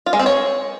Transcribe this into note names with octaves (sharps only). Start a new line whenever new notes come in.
F4
G#3
C4
C#5